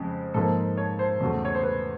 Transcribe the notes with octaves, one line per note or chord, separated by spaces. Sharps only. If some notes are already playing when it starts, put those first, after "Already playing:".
Already playing: F2 C#3 F3 G#3
G#2 F3 A#3 A4
C#5
C5
E2 C#3 F#3 A3
C#5
C5
B4